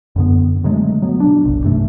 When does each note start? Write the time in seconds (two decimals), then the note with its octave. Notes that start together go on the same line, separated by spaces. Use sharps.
0.16 F#2 D3 B3
0.64 D3 F#3 G#3 A3
1.02 F#3 B3
1.20 B2 D4
1.45 G1 C2
1.64 G2 C3 E3 A3